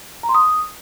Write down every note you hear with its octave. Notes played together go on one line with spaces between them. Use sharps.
A#5
C6
D#6